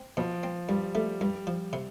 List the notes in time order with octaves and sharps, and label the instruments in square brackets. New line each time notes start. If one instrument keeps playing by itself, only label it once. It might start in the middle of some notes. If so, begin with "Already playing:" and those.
Already playing: [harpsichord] C4
[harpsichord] B2 [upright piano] F3
[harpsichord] C4
[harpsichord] G2 [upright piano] G3
[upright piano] G3 [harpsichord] A3
[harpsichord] G2 [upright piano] G3
[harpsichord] F3
C3